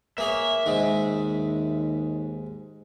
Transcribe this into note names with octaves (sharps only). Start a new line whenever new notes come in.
A#3 G#4 C#5 E5
D#2 G#2 G#3